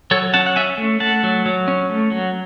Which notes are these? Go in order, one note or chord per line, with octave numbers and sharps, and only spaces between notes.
F#3 A4 C#5
C#4 F#5 A5
F#5
C#4 E5 G#5
A3
A3 F#5 A5
F#3
F#3
C#4
A3
F#3